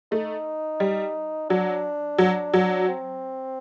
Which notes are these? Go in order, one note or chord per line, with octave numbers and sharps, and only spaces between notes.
A3 D#4
G3
F#3 D4
F#3
F#3
C4